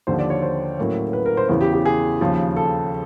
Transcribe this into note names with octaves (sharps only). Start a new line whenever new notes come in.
D#2 D3 F3 C5
D5
C#5
C5
A2 F#3 A#3 C#4
B4
A#4
C5
E2 C#3 E3 C5
G4
G4
G#4
D#2 C#3 F3
A4